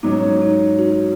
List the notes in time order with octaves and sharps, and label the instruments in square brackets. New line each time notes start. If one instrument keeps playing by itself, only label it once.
[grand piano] G#2 F#3 C#4 [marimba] D#4
[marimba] D#4
F#4